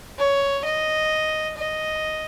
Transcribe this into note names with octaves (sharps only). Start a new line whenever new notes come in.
C#5
D#5
D#5